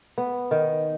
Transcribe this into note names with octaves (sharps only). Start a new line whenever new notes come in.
B3
D#3